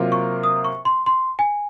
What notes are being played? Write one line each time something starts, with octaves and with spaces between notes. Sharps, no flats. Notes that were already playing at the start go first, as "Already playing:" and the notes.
Already playing: C3 F#3 A#3 F4 A#4
C#6
D#6
C#6
C6
C6
G#5